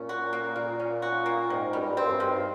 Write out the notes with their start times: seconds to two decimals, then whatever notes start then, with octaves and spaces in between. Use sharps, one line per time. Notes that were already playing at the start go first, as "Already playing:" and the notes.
Already playing: A#2 C#4
0.09 F#4
0.33 A#3
0.56 A#2 A#3
0.80 C#4
1.02 F#4
1.26 A#3
1.50 G#2 D#3
1.73 F#2 G3
1.81 G2
1.97 C4
2.07 F#2
2.12 G2
2.20 D#3